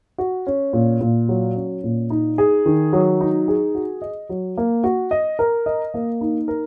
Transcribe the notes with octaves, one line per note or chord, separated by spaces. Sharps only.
F#4
C#4
A#2
A#2
F#3
C#4
A#2
D#4
G#4
D#3
F#3
D#4
G#4
F#4
D#5
F#3
A#3
F#4
D#5
A#4
D#5
A#3
D#4
A#4